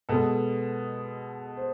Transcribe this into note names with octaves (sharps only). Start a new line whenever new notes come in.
B2 G#3 B3 A4
C5